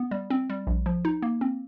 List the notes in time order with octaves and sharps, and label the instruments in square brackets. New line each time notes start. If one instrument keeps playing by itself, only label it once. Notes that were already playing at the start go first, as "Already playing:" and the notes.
Already playing: [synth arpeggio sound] B3
G3
C4
G3
A#1
F3
D#4
A#3
C4